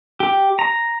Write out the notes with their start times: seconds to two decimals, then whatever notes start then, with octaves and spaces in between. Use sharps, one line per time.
0.20 G4
0.59 A#5